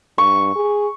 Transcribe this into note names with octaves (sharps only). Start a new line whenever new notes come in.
G2 C#6
G#4